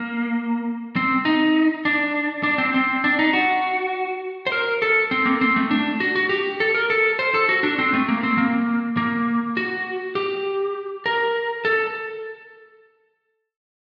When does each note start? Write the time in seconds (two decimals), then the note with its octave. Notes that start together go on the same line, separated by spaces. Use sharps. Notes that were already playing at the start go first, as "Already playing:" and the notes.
Already playing: A#3
0.96 C4
1.25 D#4
1.85 D4
2.43 D4
2.58 C4
2.74 C4
3.04 D4
3.19 D#4
3.33 F#4
4.47 C5
4.52 A#4
4.82 A4
5.11 C4
5.25 A#3
5.41 C4
5.56 A3
5.71 D4
6.00 F#4
6.15 F#4
6.29 G4
6.60 A4
6.74 A#4
6.90 A4
7.19 C5
7.34 A4
7.49 F#4
7.63 D4
7.79 C4
7.94 A3
8.08 A#3
8.23 C4
8.38 A#3
8.97 A#3
9.57 F#4
10.15 G4
11.06 A#4
11.65 A4